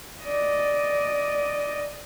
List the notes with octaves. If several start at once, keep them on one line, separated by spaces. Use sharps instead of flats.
D5 D#5